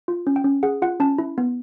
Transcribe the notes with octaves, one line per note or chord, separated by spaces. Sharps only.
F4
C#4
G5
C#4
G#4 F#5
F4 F#5
C#4 A5
E4
B3